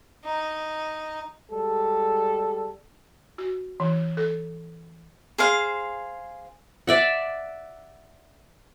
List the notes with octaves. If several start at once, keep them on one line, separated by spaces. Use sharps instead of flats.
D#4
G3 G#3 A4
F#4
E3
A4
G#4 C5 F5
D5 E5 F#5